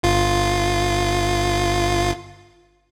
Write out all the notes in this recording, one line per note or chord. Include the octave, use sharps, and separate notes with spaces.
G1 F4